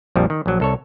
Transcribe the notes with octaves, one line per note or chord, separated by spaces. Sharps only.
A#1 F2 F3 G3
D#3
A#1 F#3
C2 A4 C#5